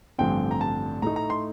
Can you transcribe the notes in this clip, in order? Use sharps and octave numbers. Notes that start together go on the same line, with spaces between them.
A1 G2 D3 F3 C4 G5
A#5
A5
A2 A3 D#4 A#5
A#5
C6